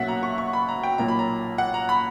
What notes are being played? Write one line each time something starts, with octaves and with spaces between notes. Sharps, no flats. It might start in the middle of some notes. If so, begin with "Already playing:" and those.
Already playing: B1 B2 A#3 C#4 E5 F#5
A#5
C#6
C#6
B5
A#5
G5
B1 A#2 A#3 C#4 A#5
B5
A#5
F#5
A#5
B5